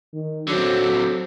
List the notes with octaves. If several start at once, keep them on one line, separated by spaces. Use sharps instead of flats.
D#3
D3 F#3 C4